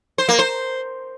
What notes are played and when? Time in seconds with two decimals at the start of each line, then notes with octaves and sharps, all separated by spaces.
0.18 C5
0.29 A#3
0.39 C5